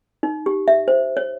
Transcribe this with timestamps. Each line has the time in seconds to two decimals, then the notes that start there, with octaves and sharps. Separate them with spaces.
0.23 D#4
0.46 G4
0.68 E5
0.88 C5
1.17 C#5